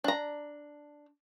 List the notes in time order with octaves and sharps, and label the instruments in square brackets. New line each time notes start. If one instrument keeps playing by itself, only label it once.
[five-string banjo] D4 A#5